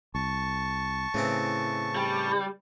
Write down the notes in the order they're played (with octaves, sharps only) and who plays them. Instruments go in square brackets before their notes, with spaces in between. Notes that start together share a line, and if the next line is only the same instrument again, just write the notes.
[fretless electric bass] C2 [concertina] A5 C#6
[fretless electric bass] A2 [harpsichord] C#3 E3 C4
[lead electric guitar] G3